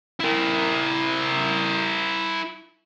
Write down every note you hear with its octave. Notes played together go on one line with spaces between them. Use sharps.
E4 A#4